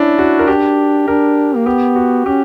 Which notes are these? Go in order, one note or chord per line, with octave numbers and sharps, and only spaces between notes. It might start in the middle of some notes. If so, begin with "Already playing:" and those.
Already playing: C#4 D4 E4
F#4
A#4
D4 G4
D4 A#4
A#3
B3 G4
F#4
C#4 G4